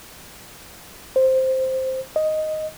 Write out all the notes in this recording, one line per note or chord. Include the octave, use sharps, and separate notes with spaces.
C5
D#5